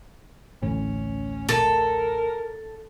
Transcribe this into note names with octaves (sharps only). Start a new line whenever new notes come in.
A1 D2 A2 C#4
A4 A#4